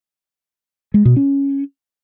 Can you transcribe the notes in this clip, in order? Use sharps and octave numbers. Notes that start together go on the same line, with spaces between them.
G#3
B2
C#4